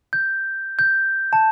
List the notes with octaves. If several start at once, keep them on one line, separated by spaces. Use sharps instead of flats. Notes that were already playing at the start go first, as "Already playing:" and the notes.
G6
G6
A5